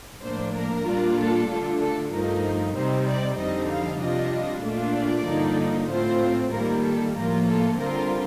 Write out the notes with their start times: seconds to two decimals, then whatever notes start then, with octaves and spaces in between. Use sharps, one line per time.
0.22 A2 F3 A#3 D4 C5
0.54 A#4
0.86 A#2 G3 A#3 D4 F4
1.17 A4
1.49 D3 A3 D4 F4
1.80 A4
2.11 G2 F3 A3 D#4 A#4
2.75 C3 G3 C4 D#4 C5
3.06 D5
3.37 F2 D3 G3 C4 D#4 D#5
3.69 F5
4.00 C3 G3 D4 F4 D#5
4.63 A#2 A3 D4 F4
4.95 D5
5.27 G2 D3 F3 A#3 D#4
5.89 A2 A3 C4 F4 C5
6.52 D#3 G3 A#3 A#4
6.84 A4
7.15 A2 F3 A#3 F4 A#4
7.47 A4
7.78 D3 G3 C4 F4 A#4